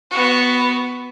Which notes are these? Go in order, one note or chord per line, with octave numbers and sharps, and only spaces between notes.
B3 F#4